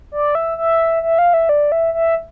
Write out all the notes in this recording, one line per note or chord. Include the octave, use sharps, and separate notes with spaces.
D5
E5
E5
E5
F5
E5
D5
E5
E5